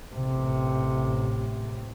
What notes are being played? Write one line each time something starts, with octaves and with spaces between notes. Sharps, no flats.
A1 C3